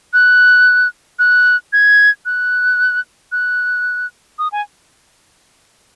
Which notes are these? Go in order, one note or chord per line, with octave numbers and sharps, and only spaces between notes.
F#6
F#6
G#6
F#6
F#6
D#6
G#5